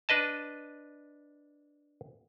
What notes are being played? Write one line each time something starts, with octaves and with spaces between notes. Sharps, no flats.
D4 B4 D#5 A5